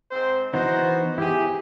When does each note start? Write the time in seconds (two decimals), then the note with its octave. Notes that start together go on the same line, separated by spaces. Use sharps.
0.11 G#2 C4 C5
0.54 E3 B3 D#4 F#4 C5
1.18 E4 G4 G#4